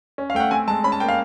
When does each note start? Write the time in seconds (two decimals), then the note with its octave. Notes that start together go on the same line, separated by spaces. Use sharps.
0.18 C#4
0.30 F5
0.35 A3 G5
0.40 F#5
0.51 C4 G#5
0.67 G#3 A5
0.84 C#4 B5
0.92 A5
1.00 A#3 G5
1.08 F5